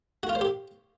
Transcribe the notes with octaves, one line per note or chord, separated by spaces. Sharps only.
F#4
F4
C5
G4